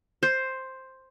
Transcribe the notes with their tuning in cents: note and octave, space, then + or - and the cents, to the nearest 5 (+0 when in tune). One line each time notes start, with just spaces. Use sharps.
C5 +5